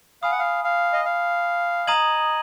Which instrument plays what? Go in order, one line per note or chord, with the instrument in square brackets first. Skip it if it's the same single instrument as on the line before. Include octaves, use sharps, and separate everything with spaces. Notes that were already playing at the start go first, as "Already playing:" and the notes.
[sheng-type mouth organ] F5 [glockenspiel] G#5 B5 D#6
[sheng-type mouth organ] F#5
F5
F5
D#5
F5
[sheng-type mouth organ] D#5 [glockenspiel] A#5 D#6 G#6 D#7 F#7